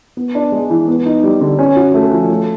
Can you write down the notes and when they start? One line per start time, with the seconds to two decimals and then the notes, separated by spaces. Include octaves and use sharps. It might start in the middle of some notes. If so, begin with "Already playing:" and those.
0.17 B3
0.35 D4
0.52 G#3
0.70 E3
0.88 B3
1.06 D#4
1.23 G3
1.41 D3
1.59 C#4
1.76 F#4
1.94 A3
2.12 F3
2.30 A3